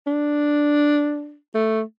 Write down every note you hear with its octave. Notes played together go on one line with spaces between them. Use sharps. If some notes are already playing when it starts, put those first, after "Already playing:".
D4
A3